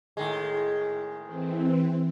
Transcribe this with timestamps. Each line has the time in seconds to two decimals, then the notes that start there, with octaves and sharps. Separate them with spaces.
0.17 A2 D#3 G#3
1.25 E3 C4